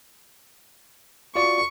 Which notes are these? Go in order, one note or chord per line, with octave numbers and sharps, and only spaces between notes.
F4 F#4 D5 C#6